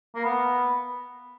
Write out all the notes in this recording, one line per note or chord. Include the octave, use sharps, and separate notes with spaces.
A#3
B3